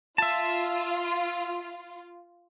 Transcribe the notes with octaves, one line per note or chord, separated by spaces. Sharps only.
F4 E5 A5